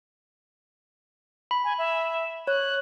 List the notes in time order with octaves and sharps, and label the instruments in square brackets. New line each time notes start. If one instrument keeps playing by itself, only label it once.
[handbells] B5
[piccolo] G#5
E5
[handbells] C#5 [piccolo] F#6